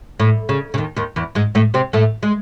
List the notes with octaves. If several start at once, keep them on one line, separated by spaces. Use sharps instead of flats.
A2
C#3
C#3
D#2 D#3
D#2 D#3
E2 E3
G#2 G#3
A2 A3
C3 C4
A2 A3
G#3